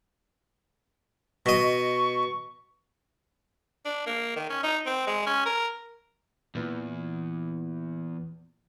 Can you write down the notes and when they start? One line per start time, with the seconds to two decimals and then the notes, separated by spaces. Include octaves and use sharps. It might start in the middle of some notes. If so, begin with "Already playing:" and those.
1.46 B2 D#5 C#6
3.85 D4
4.06 A#3
4.36 D#3
4.50 C#4
4.63 D#4
4.86 C4
5.07 G#3
5.26 C#4
5.46 A#4
6.55 E2 A#2 E3